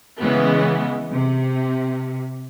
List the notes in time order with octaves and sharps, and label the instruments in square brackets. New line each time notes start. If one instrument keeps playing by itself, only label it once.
[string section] C#3 E3 G#3 B3
C3